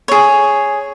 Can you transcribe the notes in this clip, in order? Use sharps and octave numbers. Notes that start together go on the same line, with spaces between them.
G#4 C#5